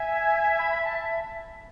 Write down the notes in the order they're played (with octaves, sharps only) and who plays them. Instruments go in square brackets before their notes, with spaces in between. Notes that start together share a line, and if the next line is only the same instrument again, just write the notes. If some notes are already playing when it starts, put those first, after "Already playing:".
Already playing: [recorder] E5 [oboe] G#5
[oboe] B5
B5
A5